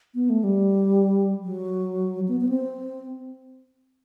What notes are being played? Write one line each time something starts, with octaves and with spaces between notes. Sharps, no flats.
B3
A3
G3
F#3
B3
B3
C4